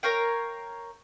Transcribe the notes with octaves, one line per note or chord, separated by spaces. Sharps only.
A#4 C#5 F5 G5